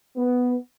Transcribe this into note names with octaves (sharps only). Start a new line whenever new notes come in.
B3